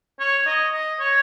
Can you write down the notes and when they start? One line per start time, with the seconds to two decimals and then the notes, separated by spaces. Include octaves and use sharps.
0.20 C#5
0.46 D#5
0.73 D#5
1.00 C#5